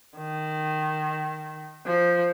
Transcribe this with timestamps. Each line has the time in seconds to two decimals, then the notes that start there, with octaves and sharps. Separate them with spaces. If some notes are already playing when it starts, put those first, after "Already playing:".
0.17 D#3
1.86 F3